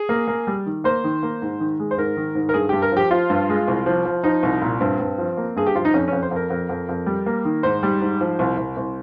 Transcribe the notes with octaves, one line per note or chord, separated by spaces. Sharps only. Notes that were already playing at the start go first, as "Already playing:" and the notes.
Already playing: G#4
A#3
A#3
G3
D#3
A#3 C5
D#3
A#3
G#2
D#3
G#3
C5
G#2 A#4
D#3
G#2
A#4
G2 G#4
G2 G4
A#4
F3 G4
F3 F4
G2
G#3
C2
F3
F3
F3 D#4
C2
A#2
G2 C4
G2
F3
A#3
G2 G#4
G4
F3 F4
D#4
F2 C#4
F2 C#4
C5
F2 A#4
F2
F2
F2
G3
A#3
D#3
G#2 C5
G3
G#2
F3
C2
C2
C2